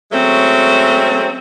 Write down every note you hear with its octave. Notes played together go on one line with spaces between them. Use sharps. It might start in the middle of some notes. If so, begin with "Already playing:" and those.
F#3 G#3 A3 C4 C#4